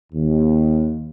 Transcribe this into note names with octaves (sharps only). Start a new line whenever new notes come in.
D#2